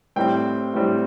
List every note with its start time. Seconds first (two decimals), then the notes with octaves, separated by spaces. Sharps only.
0.16 A2 G3 C4 G5
0.74 A2 G3 C4